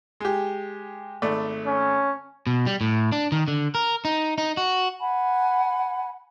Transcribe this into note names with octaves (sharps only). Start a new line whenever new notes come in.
G#3 G4
G#1 A3 D5
C#4
B2
G3
A2
D4
D#3
D3
A#4
D#4
D#4
F#4
F#5 G#5 B5